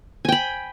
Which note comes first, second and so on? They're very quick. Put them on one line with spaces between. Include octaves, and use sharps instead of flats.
G#5 G5 B5